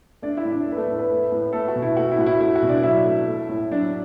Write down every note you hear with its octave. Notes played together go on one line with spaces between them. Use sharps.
A3 D4 D5
E4 E5
A2
D4 D5
A3
B4
A3 A4
A2
B3 B4
A3
A2
A3 B3 A4
F#4
B2
E4
A3 F#4
E4
A2 F#4
E4
A3 E4
F#4
B2
D4 D5
F#3 E4 E5
A3
A3
A2
F#3 D4 D5